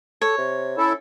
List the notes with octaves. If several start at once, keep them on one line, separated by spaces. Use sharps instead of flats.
A4 C#5
C3
C#4 E4 A4